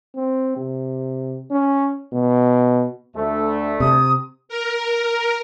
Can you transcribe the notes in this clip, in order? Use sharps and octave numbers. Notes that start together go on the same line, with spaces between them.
C4
C3
C#4
B2
D2 A3
C3 D#6
A#4